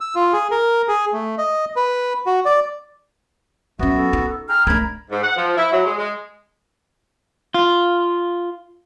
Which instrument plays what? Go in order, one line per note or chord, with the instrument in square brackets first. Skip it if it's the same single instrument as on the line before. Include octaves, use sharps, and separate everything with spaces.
[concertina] E6
F4
G#4
A#4
G#4
A3
D#5
B4
F#4
D5
[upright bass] F#3 C#4 [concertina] B3 F#4 [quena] E5
[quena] A4
[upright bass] D#4
[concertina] G#4 G5 A#5 [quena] F6
[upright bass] A3 D4 [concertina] A#4 A#5 B5 [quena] G#6
[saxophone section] G#2
F#5
F3
E4
F#3
G#3
G#3
[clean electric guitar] F4